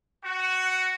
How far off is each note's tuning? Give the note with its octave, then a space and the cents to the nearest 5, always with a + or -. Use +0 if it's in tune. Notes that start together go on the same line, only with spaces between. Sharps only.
F#4 +0 F#5 +10